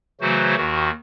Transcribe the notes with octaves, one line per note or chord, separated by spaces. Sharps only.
C#3 E3 F#3 A3 F#4 C5
D#2 D#3 F#4